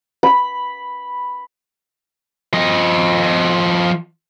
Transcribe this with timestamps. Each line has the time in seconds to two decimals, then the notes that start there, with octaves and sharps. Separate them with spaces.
0.23 B5
2.53 F3 D#5